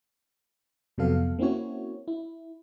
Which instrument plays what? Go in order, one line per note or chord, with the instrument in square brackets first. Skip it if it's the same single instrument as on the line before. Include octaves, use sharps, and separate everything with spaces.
[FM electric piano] F2 C3 F#3 B3 A4 F5
A#3 C4 C#4 E4 F#4 C#5
E4